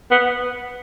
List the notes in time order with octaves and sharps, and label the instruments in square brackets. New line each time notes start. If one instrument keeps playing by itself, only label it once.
[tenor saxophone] B3